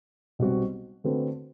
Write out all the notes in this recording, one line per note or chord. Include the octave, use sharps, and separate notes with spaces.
B1 B2 G3 C4 F#4
D3 A3 C4 F#4 B4